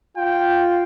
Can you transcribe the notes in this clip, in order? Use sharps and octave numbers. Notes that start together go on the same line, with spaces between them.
F4 G5